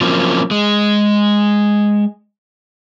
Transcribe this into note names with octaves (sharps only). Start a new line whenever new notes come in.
F3 F#3 A#3 C4 C#4
G#3